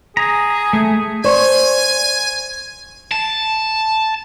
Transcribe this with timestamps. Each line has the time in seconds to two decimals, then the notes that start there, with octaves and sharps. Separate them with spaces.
0.17 G#4 A#5
0.73 A3
1.24 C5 D5 G#5 A5 C#6
3.12 A5